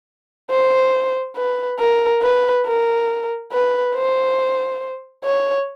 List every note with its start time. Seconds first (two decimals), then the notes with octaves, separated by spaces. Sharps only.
0.50 C5
1.36 B4
1.80 A#4
2.22 B4
2.66 A#4
3.52 B4
3.95 C5
5.24 C#5